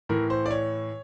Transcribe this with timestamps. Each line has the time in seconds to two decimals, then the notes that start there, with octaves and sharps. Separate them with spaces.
0.09 A2 E3 A#4
0.30 C5
0.46 D5
0.51 C#5